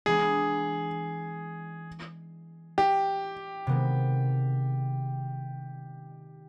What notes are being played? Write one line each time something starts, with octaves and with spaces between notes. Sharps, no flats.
E3 G#3 B3 D4 G#4
G4
C3 D#3 G#3 B3